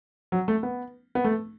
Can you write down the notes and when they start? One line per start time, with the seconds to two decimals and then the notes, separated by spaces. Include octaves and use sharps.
0.32 F#3
0.48 A3
0.63 B3
1.15 B3
1.24 A3